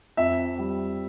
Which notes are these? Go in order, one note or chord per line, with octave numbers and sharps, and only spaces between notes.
F2 E5
G3